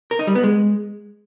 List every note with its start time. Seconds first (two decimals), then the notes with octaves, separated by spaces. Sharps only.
0.11 A#4
0.19 D#4
0.27 G3
0.35 B3
0.43 G#3